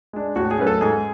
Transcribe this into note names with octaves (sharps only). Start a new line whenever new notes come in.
G#3 D4
A2 F#4
G#4
F#3 A3 C#4 B4
A4
G#2 G#4